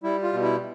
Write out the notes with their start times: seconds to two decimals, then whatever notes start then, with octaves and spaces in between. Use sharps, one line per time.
0.03 G3 E4
0.23 F4
0.33 B2
0.43 E4